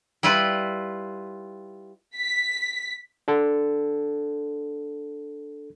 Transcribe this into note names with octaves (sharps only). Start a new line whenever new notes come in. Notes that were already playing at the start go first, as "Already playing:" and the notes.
G3 E4 F4 B4
B6
D4 A4